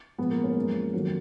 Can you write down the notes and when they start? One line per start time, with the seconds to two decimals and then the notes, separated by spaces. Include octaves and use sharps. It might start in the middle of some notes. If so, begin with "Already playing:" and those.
0.18 A#2 F3 G#3 B3
0.31 A#3
0.43 A#3 C#4
0.56 F#2 F3 G#3
0.94 F2 D#3 F#3